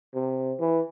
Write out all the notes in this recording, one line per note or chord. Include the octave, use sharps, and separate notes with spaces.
C3
E3